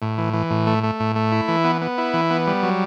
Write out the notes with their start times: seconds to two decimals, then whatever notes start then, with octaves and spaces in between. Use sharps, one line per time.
0.02 A2
0.18 E3
0.33 E3
0.50 A2
0.67 A3
0.84 A3
1.00 A2
1.16 A3
1.32 E4
1.48 E3
1.64 B3
1.82 B3
1.98 E4
2.13 E3
2.30 B3
2.47 G3
2.63 F#3